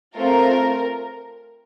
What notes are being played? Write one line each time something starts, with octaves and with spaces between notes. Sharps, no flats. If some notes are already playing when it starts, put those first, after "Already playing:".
A3 C4 F4 A#4